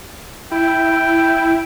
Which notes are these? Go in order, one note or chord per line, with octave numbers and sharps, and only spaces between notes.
E4 G5